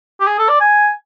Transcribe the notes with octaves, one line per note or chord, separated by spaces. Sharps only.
G4
G#4
A4
D5
G#5